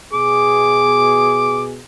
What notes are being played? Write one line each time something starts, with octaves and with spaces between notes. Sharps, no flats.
B2 G#4 D6